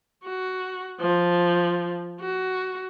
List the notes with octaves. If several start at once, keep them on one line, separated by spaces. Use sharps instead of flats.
F#4
F3
F#4